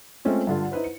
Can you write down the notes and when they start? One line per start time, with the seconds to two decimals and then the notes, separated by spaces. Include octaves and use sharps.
0.25 G#3 A3 C4 C#4 F4
0.47 G2 D3 F4
0.72 D#4 E4 B4 C5
0.84 C#7